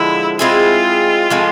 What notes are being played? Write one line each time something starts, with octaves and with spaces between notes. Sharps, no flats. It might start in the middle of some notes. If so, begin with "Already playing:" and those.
Already playing: D3 F3 G#3 B3 E4
G#3 C4 E4 F4 G#4
A2 F3 G#3 C4